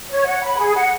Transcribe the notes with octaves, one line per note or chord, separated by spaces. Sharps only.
C#5
F#5
B5
G#4
F#5